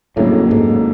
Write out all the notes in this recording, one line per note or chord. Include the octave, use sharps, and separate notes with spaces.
F2 A2 C#3 F#3 A#3 D4
G#2